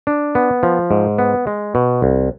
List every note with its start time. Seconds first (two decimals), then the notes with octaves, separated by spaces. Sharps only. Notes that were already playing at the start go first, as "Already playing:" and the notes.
0.07 D4
0.35 B3
0.63 F3
0.91 G#2
1.19 B3
1.47 G#3
1.75 B2
2.02 C2